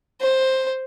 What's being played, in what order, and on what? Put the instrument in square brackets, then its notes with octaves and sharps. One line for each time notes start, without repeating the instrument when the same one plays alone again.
[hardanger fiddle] C5